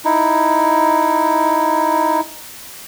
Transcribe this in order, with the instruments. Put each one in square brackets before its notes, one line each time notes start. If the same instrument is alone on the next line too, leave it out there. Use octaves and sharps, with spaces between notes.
[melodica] D#4 E4